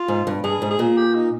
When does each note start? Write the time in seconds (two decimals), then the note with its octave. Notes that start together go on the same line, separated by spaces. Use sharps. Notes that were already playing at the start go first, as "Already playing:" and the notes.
Already playing: F4
0.08 G#2
0.27 G2
0.44 G2 G#4
0.62 G#2
0.71 G#4
0.79 A#2
0.97 G4
1.15 D#4